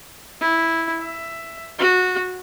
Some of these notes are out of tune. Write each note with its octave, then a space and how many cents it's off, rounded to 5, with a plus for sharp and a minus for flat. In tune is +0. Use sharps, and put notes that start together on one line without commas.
E4 -5
E5 +10
F#4 -15